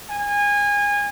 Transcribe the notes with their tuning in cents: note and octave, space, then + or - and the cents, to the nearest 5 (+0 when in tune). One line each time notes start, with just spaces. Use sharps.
G#5 -25